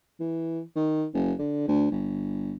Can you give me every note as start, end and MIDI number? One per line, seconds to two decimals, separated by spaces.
0.20 0.61 52
0.76 1.05 51
1.14 1.33 30
1.39 1.63 50
1.68 1.87 38
1.91 2.55 31